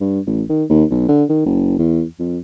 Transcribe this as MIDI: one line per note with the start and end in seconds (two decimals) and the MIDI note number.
0.01 0.20 43
0.27 0.43 33
0.49 0.64 51
0.70 0.84 39
0.90 1.06 35
1.09 1.24 50
1.29 1.42 51
1.46 1.74 30
1.79 2.04 40
2.19 2.39 41